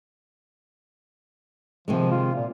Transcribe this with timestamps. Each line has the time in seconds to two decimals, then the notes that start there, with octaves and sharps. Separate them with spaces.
1.88 C3 D#3 F3 G#3
2.11 F4
2.36 A#2